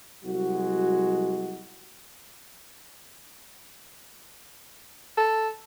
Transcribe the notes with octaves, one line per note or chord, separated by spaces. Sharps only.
C2 F#3 G#3 F#4
A4